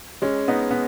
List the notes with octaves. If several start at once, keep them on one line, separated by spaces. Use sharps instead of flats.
G#3 C#4
B3 D#4
B3